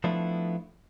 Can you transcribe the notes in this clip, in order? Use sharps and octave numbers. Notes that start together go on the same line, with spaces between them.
F3 A3 B3 D4 E4